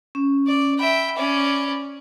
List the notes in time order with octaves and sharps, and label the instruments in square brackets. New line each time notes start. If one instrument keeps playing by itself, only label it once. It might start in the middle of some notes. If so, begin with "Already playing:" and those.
[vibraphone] C#4
[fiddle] D5
[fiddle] E5 G5 [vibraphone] B5
[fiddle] C#4 D5